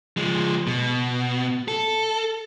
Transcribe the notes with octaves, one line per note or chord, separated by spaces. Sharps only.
F3 G#3
B2
A4